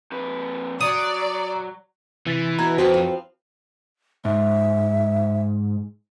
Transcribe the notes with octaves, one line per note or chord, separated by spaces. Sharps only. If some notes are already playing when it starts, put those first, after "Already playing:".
F2 B4
F#3 D5 D#6
C3 E3 A6 B6
B2 A#5 G#6
F2 F#3 C4 F#4 B4 C5
F3
G#2 E5